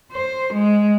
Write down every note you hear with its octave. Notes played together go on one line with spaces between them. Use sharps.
C5
G#3